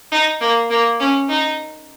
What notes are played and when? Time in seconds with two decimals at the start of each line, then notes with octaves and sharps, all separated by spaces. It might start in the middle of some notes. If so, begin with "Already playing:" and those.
0.12 D#4
0.41 A#3
0.70 A#3
1.00 C#4
1.29 D#4